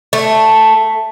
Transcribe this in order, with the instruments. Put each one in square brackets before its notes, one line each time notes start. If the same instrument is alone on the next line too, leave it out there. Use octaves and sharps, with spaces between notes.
[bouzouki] A3